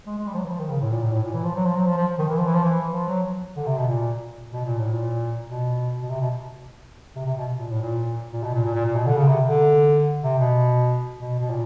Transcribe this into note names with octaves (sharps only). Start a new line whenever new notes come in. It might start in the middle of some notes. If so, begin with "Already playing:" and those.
G#3
G#3
G3
F3
F#3
E3
F3
D#3
C#3
A2
A#2
A2
A2
A#2
E3
F3
F#3
F3
F#3
F3
F3
D#3
E3
F3
E3
F3
E3
F3
F#3
D3
C3
B2
A#2
B2
A#2
A2
A#2
B2
B2
C3
B2
C3
C3
B2
A#2
A2
A#2
A#2
B2
A#2
A#2
A#2
A#2
B2
D3
C#3
C3
D3
C3
B2
B2
B2
A#2